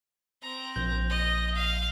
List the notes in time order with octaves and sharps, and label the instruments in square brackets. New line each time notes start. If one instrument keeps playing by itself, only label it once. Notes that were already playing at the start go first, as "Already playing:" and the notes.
[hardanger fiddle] C4 A#5
[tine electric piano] A#1 G6
[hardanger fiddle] D#5
F5